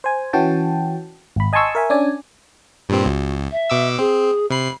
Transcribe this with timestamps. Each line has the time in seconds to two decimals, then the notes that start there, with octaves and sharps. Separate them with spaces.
0.04 C5 G#5
0.33 E3 C#4 F#4 G5 A5
1.36 G#1 B5
1.53 D#5 G#5 A5 C6 C#6 E6
1.75 A#4 E5 G#5
1.90 C#4 D4 D5 G#5
2.89 G2 A#2 C4 G4
3.06 C#2 F#4
3.51 E5
3.70 B2 D6 E6
3.99 C4 G#4
4.50 C3 B5 C7